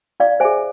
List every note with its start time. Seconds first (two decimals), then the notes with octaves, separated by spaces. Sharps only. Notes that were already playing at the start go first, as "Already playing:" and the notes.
0.20 E4 D5 F5
0.40 G#4 C5 E5 G#5